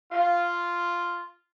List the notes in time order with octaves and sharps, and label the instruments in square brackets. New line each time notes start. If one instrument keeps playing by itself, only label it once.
[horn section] F4